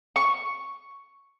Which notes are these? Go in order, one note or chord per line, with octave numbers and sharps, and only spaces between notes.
C#6